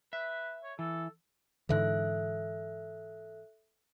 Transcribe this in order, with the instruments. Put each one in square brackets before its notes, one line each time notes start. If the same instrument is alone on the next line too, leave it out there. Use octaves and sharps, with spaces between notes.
[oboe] B4 [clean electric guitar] E5
[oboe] C#5
[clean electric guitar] E3 [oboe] A4
[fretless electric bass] G#2 D3 E3 [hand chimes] A4 E5 F#6